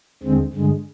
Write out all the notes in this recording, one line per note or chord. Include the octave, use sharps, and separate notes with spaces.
D#2 D3 G#3 C4
G2 D3 G#3